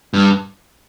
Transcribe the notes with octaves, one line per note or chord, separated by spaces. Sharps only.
G2